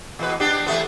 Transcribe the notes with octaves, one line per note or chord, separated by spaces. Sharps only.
E2 B2 B4
B3 D4 G4
E2 A3 B3